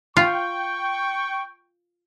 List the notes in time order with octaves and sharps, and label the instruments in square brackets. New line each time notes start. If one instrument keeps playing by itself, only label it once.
[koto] F4 [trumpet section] G5 C#6